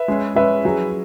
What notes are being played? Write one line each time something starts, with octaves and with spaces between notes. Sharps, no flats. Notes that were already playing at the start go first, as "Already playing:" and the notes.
Already playing: B4 E5
G#3 C#4 G#4
G#3 C#4 G#4 B4 E5
F#3 C#4 E4 G#4